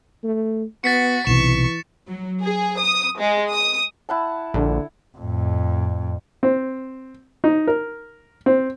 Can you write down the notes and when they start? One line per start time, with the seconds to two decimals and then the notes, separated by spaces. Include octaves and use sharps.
0.24 A3
0.84 B3 F#4 A6 B6 C#7
1.27 B1 C3 E3 C#6 E7
2.09 F#3
2.41 G#4
2.79 D#6
3.18 G#3
3.51 D#6
4.09 E4 F#5 A5
4.54 A#1 D3
5.18 F2 A2
6.43 C4
7.44 D#4
7.67 A#4
8.46 C4